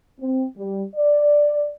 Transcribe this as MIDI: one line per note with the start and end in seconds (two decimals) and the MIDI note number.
0.20 0.44 60
0.57 0.83 55
0.95 1.72 74